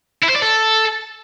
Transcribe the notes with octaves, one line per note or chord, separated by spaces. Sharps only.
E4
C5
D5
A4